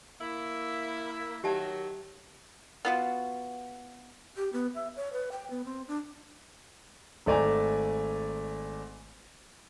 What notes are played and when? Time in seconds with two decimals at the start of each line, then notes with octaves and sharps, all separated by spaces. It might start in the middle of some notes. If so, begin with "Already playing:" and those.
0.21 A#3 E4
1.44 D#3 F#3 G4 E5 A5
2.85 B3 F4 F#4
4.37 G4
4.53 B3
4.75 E5
4.96 C#5
5.13 B4
5.32 G5
5.50 B3
5.65 C4
5.88 D4
7.26 G#1 A3 D5 G#5 A#5